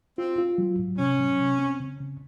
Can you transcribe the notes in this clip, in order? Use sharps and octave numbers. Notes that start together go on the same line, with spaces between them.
C4 F4
F4
F#3
G#2
C3 C#4
F#3
C3
C4
C#3
C#3